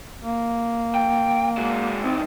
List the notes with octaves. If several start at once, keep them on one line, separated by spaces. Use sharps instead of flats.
A#3
G5
G#3 F#4
C2 D#3 C4